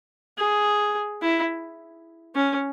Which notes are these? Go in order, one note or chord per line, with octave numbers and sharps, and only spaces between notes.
G#4
E4
C#4